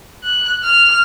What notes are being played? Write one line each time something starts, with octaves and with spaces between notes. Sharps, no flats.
F#6
F6